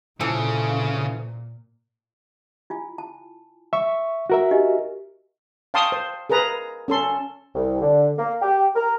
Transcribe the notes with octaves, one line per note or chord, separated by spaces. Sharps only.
A#2 C#3 E3 F3 A4
E4 F4 G#5
A5
E5 C#6
F#4 A#4 E5
D#4 G4 D#5
F5 G5 A5 C6 C#6 D#6
C5
G#4 A#4 B4 A#5
C#4 A4 C6
C2
D3
A#3
G4
A#4